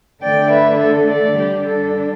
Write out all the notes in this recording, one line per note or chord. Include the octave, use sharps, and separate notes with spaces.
D3 A3 D4 D5 G5
B4 E5
A4
A4 D5
D3 G3 D4 G4
A4